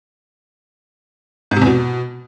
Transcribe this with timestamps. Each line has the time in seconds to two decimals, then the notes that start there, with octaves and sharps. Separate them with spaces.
1.51 G#2
1.56 C3
1.62 E2
1.67 B2